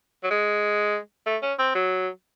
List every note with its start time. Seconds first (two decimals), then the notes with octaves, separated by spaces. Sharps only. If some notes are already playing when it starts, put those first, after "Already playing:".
0.23 F#3
0.30 G#3
1.26 A3
1.42 C#4
1.59 C4
1.75 F#3